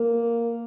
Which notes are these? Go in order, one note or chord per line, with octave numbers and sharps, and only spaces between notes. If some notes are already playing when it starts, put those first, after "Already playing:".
Already playing: A#3